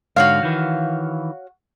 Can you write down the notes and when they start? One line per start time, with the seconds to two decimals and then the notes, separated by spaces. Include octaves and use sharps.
0.16 G#2 D3 F#4 C#5 F5
0.43 D#3 E3